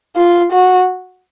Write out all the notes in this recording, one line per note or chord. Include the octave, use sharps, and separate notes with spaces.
F4
F#4